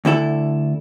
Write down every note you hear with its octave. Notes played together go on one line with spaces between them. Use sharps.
D2 D3 E4 A4